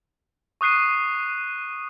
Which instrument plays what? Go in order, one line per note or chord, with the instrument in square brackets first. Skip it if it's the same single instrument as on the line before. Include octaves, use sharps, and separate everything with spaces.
[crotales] C#6 D#6 F#6 C7 D#7